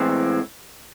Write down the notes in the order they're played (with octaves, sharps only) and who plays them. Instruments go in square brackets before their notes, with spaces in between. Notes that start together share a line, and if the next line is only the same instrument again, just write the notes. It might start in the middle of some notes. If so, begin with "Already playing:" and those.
Already playing: [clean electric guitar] A2 E3 G#3 C4